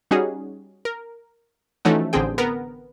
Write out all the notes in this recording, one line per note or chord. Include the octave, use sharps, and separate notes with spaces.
G3 C#4 D#4 F#4 G#4
A#4
E3 F3 A3 C#4 D#4 F#4
A1 D3 C4 G#4 G5
B3 A#4 A#5